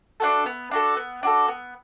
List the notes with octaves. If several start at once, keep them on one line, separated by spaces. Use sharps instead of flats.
D4 F#4 A4
B3
D4 F#4 A4
B3
D4 F#4 A4
B3